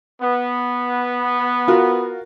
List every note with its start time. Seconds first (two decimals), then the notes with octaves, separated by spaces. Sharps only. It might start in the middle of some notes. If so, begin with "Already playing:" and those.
0.22 B3
1.68 F4 F#4 A#4